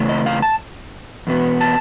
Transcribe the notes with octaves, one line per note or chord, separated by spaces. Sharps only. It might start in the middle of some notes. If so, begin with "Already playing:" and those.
Already playing: C#3 E3 A3
D#5
F5
A5
E2 B2 B3
A5